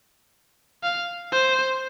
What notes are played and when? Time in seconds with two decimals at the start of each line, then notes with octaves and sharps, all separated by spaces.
0.83 F5
1.32 C5